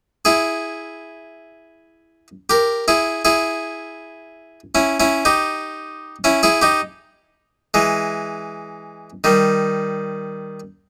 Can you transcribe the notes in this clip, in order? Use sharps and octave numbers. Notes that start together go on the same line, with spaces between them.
E4 G#4
G4 A#4
E4 G#4
E4 G#4
C#4 E4
C#4 E4
D#4 G4
C#4 E4
E4 G#4
D#4 G4
E3 G#3
D#3 G3